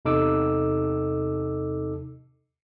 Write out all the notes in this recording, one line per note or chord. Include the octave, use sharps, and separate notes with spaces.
E2 C3 D#4 A4 D6 E6